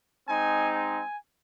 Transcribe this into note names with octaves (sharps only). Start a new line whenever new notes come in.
G#3 C4 D#4 G#5
G#5